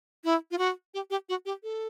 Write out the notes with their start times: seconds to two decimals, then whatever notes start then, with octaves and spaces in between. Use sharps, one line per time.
0.24 E4
0.51 F4
0.58 F#4
0.94 G4
1.10 G4
1.29 F#4
1.46 G4
1.63 A4